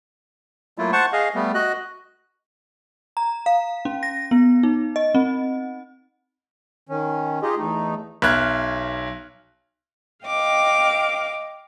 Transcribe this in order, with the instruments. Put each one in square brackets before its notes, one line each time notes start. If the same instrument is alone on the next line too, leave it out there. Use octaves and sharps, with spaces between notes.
[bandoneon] F#3 A3 A#3 E4 F4
C5 F#5 A5 C#6
G#4 D#5 F5
G3 A3 B3
F#4 D#5 F#6
[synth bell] A#5
F5
C#4
A#6
B3
D#4
D#5
C4
[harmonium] D#3 C#4
D#4 F4 G4 G#4 D#5
E2 A3 D#4
[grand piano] B1 E5 F6 F#6 G#6
[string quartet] D#5 F5 G5 D6